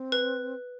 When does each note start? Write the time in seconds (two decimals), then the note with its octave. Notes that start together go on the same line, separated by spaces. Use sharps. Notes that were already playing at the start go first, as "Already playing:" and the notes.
Already playing: C4
0.12 B4